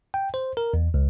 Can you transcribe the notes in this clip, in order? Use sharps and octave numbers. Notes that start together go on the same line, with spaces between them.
G5
C5
A#4
E2
C#2